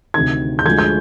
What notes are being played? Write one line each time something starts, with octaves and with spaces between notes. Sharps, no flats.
D2 C3 D#3 G#6
G6
D2 D3 F3 G#3 G#6
G6